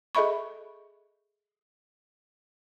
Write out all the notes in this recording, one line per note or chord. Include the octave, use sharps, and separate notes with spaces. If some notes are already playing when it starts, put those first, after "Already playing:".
G#4 A4 D#5 E5 B5 C#6